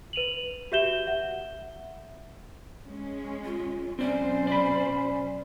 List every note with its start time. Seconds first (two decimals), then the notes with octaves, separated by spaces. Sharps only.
0.13 B4 D#7 F7 F#7
0.72 F#4 G4 E5 G6 E7 G7
1.07 E5 F#5
2.86 G#3 C#4
3.45 F4
3.99 B2 F#3 C4 C#4 C5 D5
4.47 D5 B5